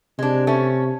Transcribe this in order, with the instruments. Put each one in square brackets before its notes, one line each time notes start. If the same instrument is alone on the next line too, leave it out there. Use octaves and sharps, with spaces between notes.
[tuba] C3 [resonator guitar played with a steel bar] G#3 D4
[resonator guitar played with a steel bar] A3 C#4